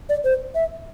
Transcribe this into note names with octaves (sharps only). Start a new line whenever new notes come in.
D5
C5
E5